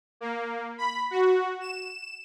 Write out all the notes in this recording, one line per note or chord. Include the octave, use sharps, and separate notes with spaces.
A#3
B5
F#4
E7